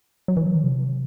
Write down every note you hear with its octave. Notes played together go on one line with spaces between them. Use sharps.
F#3
E3
F#3
D#3
C3